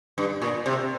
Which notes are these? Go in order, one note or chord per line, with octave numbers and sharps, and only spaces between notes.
G2
A#2
C3